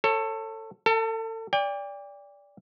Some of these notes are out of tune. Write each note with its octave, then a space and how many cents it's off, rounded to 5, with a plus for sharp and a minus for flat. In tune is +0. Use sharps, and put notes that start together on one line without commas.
A4 +20 C#5 -25
A4 +35 A5 +0
D5 -20 G5 +35